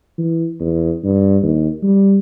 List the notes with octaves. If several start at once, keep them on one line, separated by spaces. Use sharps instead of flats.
E3
E2
G2
D#2
G3